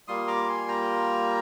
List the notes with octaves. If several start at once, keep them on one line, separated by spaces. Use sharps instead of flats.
G3 A#3 F4 C6 D#6
A#5 D6
G#5 C6
G5 A#5